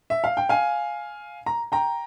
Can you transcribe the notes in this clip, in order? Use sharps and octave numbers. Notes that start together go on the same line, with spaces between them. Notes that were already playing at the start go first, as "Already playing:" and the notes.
E5
F5
G5
F5 G#5
A#5
G5 A#5